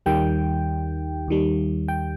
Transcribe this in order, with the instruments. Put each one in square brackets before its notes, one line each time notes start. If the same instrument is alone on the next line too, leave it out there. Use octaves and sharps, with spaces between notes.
[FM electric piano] D#2 D#3 G3 G5
D#2 D#3 G3
G5